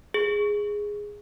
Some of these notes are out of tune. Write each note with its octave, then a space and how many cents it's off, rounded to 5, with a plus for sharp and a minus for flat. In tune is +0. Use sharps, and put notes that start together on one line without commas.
G#4 -5